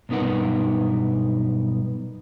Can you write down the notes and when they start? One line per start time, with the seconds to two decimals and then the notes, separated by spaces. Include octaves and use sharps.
0.09 B1 G2 B3 D#4 A#4 F#5